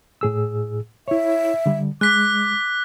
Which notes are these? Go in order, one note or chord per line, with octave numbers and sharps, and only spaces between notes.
A2 G#4 E6
E4 C#5 E5
D3 G3
G#3 D6 F#6 B6